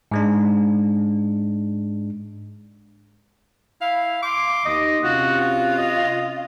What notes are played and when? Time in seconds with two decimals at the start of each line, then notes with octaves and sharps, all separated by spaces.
0.11 G#2 G#3 D4
3.81 E4 F5
4.23 C6 D6
4.65 D#2 D#3 D#5
5.03 C3 C#4 F4 F#4
5.41 F#4
5.78 D#5